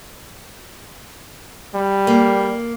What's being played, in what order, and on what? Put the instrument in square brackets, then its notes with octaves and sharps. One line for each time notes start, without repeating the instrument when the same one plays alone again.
[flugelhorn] G3
[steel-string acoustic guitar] A#3